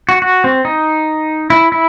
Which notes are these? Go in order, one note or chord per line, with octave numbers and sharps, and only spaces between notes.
F#4
F#4
C4
D#4
E4
E4